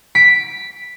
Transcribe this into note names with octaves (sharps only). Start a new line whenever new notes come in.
B6 D7